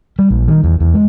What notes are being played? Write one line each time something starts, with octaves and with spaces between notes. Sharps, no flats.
G3
A#1
D#3
E2
E2
G#3